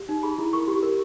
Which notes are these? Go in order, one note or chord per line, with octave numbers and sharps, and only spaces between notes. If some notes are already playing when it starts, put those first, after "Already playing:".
Already playing: G4
D#4
G#4 B5
E4
A#4 C#6
G4
A#4